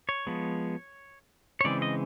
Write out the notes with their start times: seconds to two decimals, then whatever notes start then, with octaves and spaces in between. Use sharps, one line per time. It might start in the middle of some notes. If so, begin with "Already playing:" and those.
0.09 C#5
0.27 F3 G#3 B3
1.61 C#5
1.64 C#3 E3 G#3 C4 D5
1.82 D#5